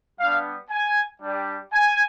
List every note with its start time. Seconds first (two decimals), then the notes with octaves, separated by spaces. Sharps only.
0.19 G3 B3 D4 F5
0.69 G#5
1.21 G3 D4 G4
1.71 G#5